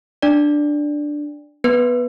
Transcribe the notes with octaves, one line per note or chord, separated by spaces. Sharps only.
D4 D5
B3 B4